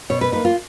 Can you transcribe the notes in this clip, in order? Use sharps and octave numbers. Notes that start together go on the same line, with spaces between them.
B2 C#5
B4
A#3 D#4 B4
F4